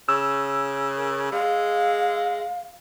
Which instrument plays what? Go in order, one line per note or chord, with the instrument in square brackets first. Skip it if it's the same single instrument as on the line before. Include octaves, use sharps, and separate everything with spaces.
[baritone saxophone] C#3 [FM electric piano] E6
[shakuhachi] A#4
[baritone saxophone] G#3 [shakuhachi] F5